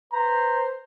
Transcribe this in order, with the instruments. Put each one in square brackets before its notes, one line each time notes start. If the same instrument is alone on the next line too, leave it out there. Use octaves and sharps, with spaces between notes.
[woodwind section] B4 C5 [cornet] A#5